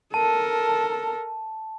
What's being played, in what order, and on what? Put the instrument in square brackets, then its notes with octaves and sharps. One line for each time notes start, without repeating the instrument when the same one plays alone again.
[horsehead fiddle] A4 A#4 [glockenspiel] A5